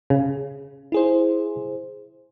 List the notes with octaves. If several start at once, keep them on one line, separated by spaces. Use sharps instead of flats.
C#3
E4 G#4 C5